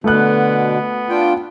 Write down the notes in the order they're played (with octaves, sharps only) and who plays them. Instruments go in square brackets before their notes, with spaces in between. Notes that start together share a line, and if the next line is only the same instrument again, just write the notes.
[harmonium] B2 D3 [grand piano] A3 F#6 [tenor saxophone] B3
[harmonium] D4 F4 G5